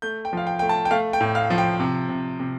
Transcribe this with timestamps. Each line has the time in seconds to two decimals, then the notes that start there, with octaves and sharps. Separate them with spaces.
0.02 A3 G6
0.25 G5
0.33 F3 F5
0.47 G5
0.59 A3 G5
0.69 A5
0.85 G5
0.91 A3 F5
1.13 G5
1.21 A2
1.35 F5
1.50 F3
1.58 G5
1.80 C3
2.09 C3
2.40 C3